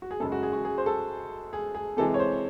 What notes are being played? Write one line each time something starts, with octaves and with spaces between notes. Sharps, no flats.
F#4
G#4
F#2 C#3 G#3 A4
F#4
G#4
F#4
G#4
C5
A4
G#4
G#4
C3 E3 G#3 A4
C#5
C5